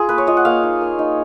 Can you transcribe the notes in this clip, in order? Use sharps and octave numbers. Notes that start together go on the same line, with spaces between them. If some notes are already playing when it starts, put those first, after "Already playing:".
Already playing: F4 G#4
A#3 B4
C#5
F4 D#5
F#5
A#3 F5
D#4
A#3
D#4